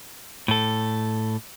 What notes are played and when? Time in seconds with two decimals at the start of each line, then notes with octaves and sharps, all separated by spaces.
0.48 A2 A4